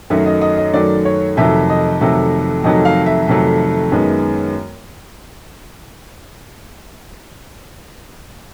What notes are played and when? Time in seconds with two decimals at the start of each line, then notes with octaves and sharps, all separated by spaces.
0.10 F#2 D#3 F#3 A3 E5
0.26 D#5
0.42 D#5
0.57 D#5
0.73 F#2 D#3 F#3 A3 D5
1.05 C#5
1.37 F2 C3 D#3 F#3 A3 E5
1.70 D#5
2.01 F2 C3 D#3 F#3 A3 E5
2.64 F2 C3 D#3 F#3 A3 D#5
2.85 F5
3.06 E5
3.28 F2 C3 D#3 F#3 A3
3.92 F#2 D#3 G#3 B3